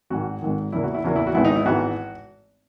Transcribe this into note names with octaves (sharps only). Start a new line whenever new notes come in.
G#1 G#2 D#3 F#4
G#1 G#2 D#3
E2 C#3 E3 A#3 E4
F#4
E4
E2 C#3 E3 A#3 F#4
E4
F#4
G#1 G#2 E3 B3 E4
D#4
E4
G#1 G#2 E3 B3 F#4